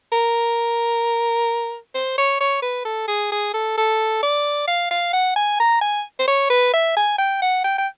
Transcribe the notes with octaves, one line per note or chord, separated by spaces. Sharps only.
A#4
C5
C#5
C#5
B4
A4
G#4
G#4
A4
A4
D5
F5
F5
F#5
G#5
A#5
G#5
C5
C#5
B4
E5
G#5
G5
F#5
G5
G5